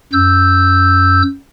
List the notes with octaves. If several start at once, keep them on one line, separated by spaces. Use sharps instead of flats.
F#2 E6 G6